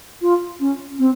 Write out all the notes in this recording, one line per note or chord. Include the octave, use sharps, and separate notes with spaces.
F4
C#4
C4